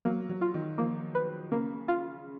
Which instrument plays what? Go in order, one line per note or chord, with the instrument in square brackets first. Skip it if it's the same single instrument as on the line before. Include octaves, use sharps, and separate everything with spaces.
[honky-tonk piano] F#3 [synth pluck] A#3
[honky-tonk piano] F#3
[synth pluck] F4
[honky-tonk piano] D#3
[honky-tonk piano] F3 [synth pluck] A#3
[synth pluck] B4
[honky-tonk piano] C#3 [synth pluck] A#3
[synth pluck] F4